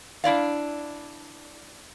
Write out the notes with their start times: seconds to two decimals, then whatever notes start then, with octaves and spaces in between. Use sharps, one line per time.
0.24 D4 E4 D5 F5